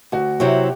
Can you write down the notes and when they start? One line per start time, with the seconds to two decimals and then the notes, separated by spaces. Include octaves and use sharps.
0.12 D2 F#4
0.40 C3 F#3 C4 E4 G4